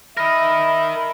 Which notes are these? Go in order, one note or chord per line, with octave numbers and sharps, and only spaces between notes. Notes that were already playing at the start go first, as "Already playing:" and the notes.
A#4 D#5 E5 B5 F6 A#6